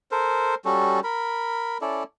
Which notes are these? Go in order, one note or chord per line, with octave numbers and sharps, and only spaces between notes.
A4 A#4 C5
G3 C#4 F#4 A4
A#4 B5
C#4 E4 A4 D5